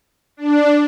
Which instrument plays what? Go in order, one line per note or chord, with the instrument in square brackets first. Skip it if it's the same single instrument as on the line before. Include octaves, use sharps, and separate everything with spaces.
[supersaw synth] D4